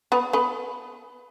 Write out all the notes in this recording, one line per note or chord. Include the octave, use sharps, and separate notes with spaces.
B3 B4
B3 B4